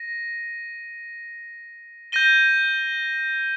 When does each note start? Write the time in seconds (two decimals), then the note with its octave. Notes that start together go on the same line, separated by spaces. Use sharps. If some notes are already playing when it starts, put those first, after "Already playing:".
Already playing: A#6 D#7
2.12 G6 A#6 D#7 G7